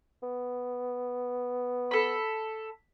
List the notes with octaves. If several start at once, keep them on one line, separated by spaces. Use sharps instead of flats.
B3
A4 B5